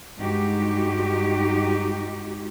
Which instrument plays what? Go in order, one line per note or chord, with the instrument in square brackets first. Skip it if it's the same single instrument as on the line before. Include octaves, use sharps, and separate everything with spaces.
[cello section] G2 G#3 D#4 F#4 G4